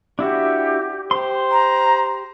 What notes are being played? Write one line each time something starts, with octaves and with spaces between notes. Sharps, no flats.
D4 E4 F#4 G4
G4 C5 C6
A#5